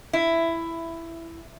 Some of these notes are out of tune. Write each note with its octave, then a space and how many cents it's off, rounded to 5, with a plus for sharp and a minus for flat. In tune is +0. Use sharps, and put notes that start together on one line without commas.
E4 +10